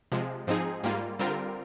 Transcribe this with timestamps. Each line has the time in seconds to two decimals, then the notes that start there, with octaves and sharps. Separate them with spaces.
0.12 C3 F3 G#3
0.47 G#2 F3 C4 D#4 G#4
0.83 G#2 G3 A#3 F4
1.19 D3 G3 C4 F4 A#4